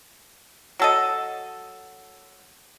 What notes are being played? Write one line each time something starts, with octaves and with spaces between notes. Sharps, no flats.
F#3 A4 D#5